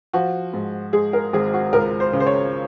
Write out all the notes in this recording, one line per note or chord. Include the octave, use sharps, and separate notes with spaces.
F3 F#4
G#2
G#3 G#4
A#4
G#1 G#4
F#4
C#2 A#4
C5
C#3
C5
C#5